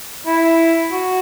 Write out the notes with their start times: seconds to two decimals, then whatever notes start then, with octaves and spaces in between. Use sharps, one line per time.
0.26 E4
0.91 F#4